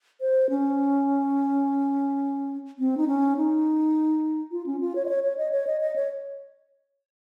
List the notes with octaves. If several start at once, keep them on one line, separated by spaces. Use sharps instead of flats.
C5
C#4
C4
D#4
C#4
D#4
F4
C#4
F4
C#5
D#5
C#5
C#5
D#5
C#5
D#5
D#5
C#5